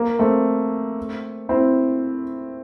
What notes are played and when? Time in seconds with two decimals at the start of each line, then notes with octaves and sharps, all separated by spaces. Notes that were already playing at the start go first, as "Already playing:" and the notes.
Already playing: A#3
0.19 A3 C4
1.49 C4 E4